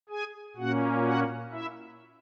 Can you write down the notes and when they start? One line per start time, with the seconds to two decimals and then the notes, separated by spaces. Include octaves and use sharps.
0.09 G#4 G#5
0.57 A#2 A#3 C#4 F#4 F#5
1.05 F#4 F#5
1.52 E4 E5